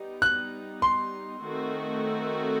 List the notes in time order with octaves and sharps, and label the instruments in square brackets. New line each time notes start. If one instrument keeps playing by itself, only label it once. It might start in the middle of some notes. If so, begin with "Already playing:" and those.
Already playing: [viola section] G3 B3 D#4
[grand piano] F#6
C6
[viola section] D#3 A3 C4 F#4 A4